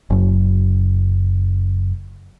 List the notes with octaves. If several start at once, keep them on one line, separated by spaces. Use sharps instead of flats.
F#1 F#2